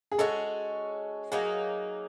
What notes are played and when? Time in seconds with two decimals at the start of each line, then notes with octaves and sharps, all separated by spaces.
0.12 G#4
0.18 G#3 C#4 F#4 A4
1.31 F#3 A#3 D#4 G#4